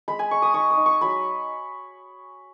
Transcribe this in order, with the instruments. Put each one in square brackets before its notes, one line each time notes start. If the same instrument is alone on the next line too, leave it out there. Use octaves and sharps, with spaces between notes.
[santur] G#3 B5
G#5
G#3 C#6
D#6
D#4 C#6
D#6
D#4
C#6
F#3 B5